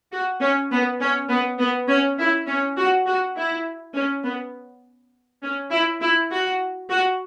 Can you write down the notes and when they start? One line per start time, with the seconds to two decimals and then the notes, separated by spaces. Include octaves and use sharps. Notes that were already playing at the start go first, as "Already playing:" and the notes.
0.12 F#4
0.41 C#4
0.71 B3
1.00 C#4
1.29 B3
1.59 B3
1.89 C#4
2.19 E4
2.47 C#4
2.78 F#4
3.06 F#4
3.36 E4
3.95 C#4
4.25 B3
5.43 C#4
5.72 E4
6.02 E4
6.31 F#4
6.91 F#4